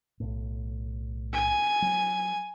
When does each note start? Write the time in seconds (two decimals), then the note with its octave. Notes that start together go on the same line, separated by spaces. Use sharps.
0.20 B1 A2
1.33 G#5
1.82 F#3